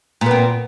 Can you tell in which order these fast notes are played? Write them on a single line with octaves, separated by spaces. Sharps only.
A#2 B3 C4